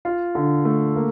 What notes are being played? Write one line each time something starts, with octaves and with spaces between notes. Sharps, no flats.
F4
D3
A3
A#3